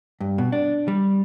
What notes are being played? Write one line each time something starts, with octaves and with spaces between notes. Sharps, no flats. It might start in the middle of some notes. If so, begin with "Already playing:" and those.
G2
B2
D4
G3